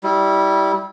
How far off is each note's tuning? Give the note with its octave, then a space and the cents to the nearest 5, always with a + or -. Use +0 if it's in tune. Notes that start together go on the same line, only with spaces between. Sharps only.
G3 -15 E4 -25